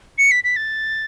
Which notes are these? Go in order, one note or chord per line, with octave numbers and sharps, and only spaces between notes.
C#7
B6
B6
A6